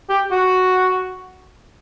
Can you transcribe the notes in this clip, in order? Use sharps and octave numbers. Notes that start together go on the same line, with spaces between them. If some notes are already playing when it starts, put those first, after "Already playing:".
G4
F#4